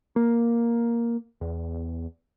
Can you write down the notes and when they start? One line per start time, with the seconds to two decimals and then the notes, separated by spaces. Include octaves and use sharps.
0.16 A#3
1.41 E2